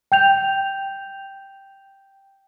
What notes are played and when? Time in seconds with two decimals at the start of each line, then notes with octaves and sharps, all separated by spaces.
0.12 G5 G6 F7